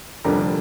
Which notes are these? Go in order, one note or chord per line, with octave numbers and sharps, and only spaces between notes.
F1 F2 D3 G3 D4 A#4